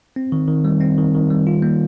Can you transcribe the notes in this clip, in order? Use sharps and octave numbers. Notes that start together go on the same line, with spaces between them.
C4
D#3
D#3
G3
C4
D#3
D#3
G3
F4
A#3